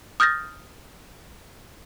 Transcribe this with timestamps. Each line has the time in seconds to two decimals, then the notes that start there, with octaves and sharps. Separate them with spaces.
0.20 D#6 F6 G6 A6 A#6